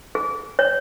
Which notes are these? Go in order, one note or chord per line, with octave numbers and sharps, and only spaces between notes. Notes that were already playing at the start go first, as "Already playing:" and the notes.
G#4
C#5